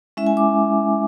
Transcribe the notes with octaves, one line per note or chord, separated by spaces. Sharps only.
G#3 C#4 E4 E5
G#5
D6